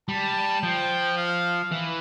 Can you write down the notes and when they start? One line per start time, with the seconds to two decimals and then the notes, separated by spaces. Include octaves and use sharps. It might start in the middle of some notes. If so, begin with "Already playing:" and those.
0.08 G3 A5
0.63 F3 G5
1.17 F5
1.72 E3